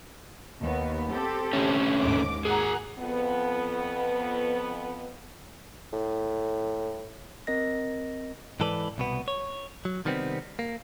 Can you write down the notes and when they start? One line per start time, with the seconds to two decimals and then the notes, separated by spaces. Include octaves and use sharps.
0.60 D#2 B3
1.11 C4 G4 A4
1.53 D3 A3 C#4
2.00 D#2 G#2 D6
2.45 G#4 A#4 F#5 G#5 A#5
2.98 F2 B3
5.92 A2
7.47 C4 A#4 D#5 A#6
8.60 G#2 E3 A4 B4 D5
8.98 C2 B2 B3
9.28 C#5
9.85 F#3
10.05 C3 D#3 G3 B3 C4
10.59 A#3